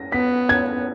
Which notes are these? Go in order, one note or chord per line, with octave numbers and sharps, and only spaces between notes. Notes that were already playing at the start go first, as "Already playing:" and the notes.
Already playing: A#6
B3 B6
G#6